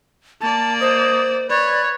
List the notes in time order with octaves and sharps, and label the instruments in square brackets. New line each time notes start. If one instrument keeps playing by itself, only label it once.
[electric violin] A#3 D5 [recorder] A5
[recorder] C5 [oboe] D#5
[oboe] B4 [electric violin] C#5 [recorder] D5